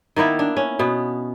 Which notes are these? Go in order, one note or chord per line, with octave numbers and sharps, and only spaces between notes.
D#3 A#3 B3 E4
D4
C#4
B2 B3